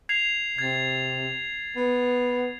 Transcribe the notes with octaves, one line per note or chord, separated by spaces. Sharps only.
G#6 C7 F7
C3 G#6 A6
B3